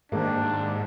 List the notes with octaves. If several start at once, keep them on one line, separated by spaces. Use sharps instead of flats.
D#2 G#2 A#3 D4